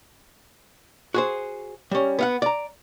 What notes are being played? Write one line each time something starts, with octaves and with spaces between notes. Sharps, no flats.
F#4 G#4 C5
G3 C#4
B3 F5 F#5
D5 A#5